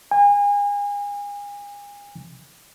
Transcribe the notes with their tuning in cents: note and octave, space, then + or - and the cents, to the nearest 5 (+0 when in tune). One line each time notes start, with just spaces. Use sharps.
G#5 -35